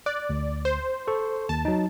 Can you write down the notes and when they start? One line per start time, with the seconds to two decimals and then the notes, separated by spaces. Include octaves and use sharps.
0.06 D5 F#6
0.30 D2
0.65 C5
1.08 A4 C#6
1.49 D#2 A5
1.65 F#3 D#4